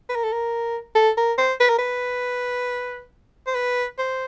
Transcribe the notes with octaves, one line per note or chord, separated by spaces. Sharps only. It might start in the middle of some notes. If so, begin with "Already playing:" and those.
B4
A#4
A4
A#4
A4
A#4
C5
B4
A#4
B4
C5
B4
C5